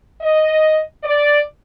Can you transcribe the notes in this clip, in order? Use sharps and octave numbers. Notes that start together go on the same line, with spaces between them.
D#5
D5